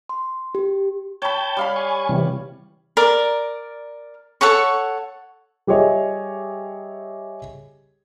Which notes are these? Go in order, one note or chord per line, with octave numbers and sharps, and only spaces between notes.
C6
G4
C#5 G5 A5 B5 G6
G3 F5 B5
G#5 C#6
C3 E3 G3
A#4 D5
A4 C#5 F#5 C#6
G3 G4 G#4 C#5 D#5 E5